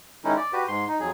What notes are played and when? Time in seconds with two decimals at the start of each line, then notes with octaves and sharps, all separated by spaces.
0.24 D#3 G#3 C#4 D#4 E4
0.37 D5
0.53 F#4 G4 B4
0.68 G#2 C6
0.87 D#4
1.00 F2 F#3 G#4